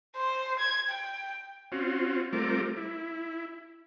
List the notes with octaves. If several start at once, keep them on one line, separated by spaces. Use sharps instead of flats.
C5
G#6
G5
C4 C#4 F4 F#4
G3 A3 C4 F4 A#4 D6
E4